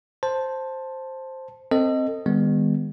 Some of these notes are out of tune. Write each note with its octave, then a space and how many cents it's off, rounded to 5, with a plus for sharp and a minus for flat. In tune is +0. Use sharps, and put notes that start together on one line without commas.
C5 +5 A5 +0
C4 +5 A4 +35 D#5 +0
D#3 +0 G#3 -45 B3 +0